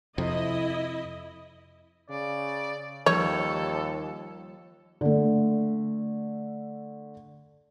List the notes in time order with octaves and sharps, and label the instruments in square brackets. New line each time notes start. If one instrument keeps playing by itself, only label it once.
[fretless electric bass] F2 C3 [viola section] E4 D#5
[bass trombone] C#3 [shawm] D5
[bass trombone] D#2 [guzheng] F3 G3 [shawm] A4 [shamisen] C#5
[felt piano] D3 A3